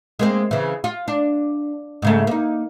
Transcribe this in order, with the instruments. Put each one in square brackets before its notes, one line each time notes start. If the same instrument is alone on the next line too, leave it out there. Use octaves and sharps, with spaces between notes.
[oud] G#3 A#3 C4
C#3 E3
F4
D4
G#2 C#3 A3
A#3 D#4